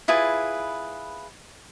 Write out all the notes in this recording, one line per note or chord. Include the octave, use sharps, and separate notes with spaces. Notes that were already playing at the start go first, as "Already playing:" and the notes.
E4 F4 G#4 B4